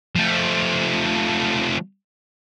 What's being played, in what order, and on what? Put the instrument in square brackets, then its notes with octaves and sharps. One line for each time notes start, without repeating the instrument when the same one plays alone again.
[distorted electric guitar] F3 A3